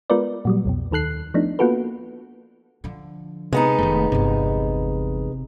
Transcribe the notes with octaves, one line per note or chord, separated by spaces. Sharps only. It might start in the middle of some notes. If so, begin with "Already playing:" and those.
G#3 B3 F4 A#4 B4 D5
A#2 F#3 G3
C2 F2 B2
D#2 D#3 A4 F#6 C7
F3 A3 B3 D4 D#4
A#3 B3 F4 F#4 A4 B4
D3 F3
C3 G#3 B3 D#4
F1 D#3 A3
G1 E2 C3